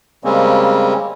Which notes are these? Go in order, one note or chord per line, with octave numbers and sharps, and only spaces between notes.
C#3 G3 G#3 A#3 C4 C#4